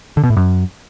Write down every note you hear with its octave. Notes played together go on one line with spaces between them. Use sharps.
D3
B2
A2
F#2